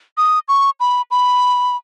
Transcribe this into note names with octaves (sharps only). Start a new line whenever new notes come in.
D#6
C#6
B5
B5